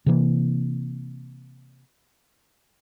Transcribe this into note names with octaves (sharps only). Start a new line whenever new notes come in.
C3 E3 A#3